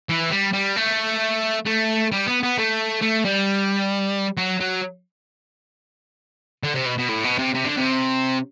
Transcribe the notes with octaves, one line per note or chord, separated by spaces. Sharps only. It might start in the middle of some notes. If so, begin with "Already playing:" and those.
E3
G3
G3
A3
A3
G3
B3
B3
A3
A3
G3
F#3
F#3
D3
C3
B2
B2
A2
B2
C3
C3
D3
C3